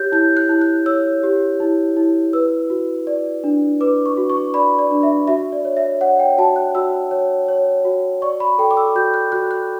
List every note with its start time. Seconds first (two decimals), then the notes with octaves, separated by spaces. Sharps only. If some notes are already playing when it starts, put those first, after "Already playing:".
Already playing: G4 C#5 F#6 G6
0.12 E4 G6
0.37 F#6
0.49 E4
0.61 F#6
0.86 C#5 E6
1.23 G4
1.60 E4
1.97 E4
2.33 B4 E6
2.70 F#4
3.07 D5
3.44 D4
3.80 B4 D6
4.06 C#6
4.17 F#4
4.30 C#6
4.54 D5 B5
4.79 D5
4.91 D4
5.03 E5
5.28 F#4 E5
5.52 D5
5.65 C#5
5.77 E5
6.01 C#5 F#5
6.19 G5
6.38 F#4 A5
6.56 F#6
6.75 F#4 E6
7.11 C#5
7.49 C#5
7.85 F#4
8.22 D5 C#6
8.40 B5
8.58 A4 G5
8.71 D6
8.77 E6
8.95 F#4 G6
9.14 F#6
9.32 F#4 F#6
9.51 F#6